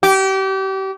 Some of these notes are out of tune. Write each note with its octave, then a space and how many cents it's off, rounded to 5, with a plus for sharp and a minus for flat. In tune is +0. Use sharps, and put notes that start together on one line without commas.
G4 -30